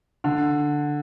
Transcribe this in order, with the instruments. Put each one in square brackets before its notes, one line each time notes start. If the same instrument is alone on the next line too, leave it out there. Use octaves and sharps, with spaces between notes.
[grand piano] D3